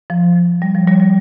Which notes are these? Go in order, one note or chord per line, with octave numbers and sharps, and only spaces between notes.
F3
G3
F3
G3
G3